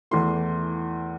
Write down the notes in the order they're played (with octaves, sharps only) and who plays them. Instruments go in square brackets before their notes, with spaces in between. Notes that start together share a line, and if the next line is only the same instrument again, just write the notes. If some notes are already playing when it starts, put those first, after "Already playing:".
[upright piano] E2 E3 A3 C6